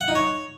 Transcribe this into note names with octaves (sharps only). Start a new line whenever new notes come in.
F#5
D#4
C#5